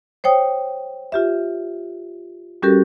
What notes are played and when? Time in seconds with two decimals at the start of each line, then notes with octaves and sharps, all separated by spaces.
0.24 C5 C#5 G5 D#6
1.12 F4 G4 E5
2.62 G3 C#4 F#4 G4 A4 A#4